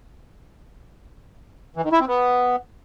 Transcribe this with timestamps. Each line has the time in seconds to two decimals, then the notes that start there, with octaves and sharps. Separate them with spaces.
1.76 E3
1.84 D#3
1.92 E4
2.00 C4
2.08 B3